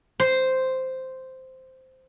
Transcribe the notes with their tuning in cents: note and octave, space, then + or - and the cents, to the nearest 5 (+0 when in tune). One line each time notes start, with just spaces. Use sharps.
C5 -5